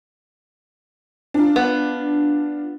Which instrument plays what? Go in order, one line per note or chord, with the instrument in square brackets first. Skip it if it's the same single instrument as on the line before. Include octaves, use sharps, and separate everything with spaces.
[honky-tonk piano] D4 F4
[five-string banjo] B3